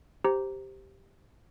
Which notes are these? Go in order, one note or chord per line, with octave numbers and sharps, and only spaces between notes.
G4 C5 A#5